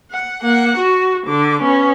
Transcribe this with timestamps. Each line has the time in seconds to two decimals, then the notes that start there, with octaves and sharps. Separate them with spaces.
0.11 F#5
0.42 A#3 F#5
0.78 F#4
1.27 D3 D6
1.61 B3 C#4